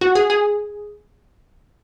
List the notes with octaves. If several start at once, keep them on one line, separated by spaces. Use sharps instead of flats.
F#4
G#4
G#4